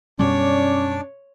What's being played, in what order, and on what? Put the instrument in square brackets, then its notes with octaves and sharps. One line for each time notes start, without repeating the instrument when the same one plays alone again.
[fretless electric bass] F#2 B2 G3 [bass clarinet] C#4 [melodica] D4 D5 [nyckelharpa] C#5